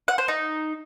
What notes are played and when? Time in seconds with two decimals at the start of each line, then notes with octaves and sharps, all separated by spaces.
0.08 F#5
0.18 C5
0.28 D#4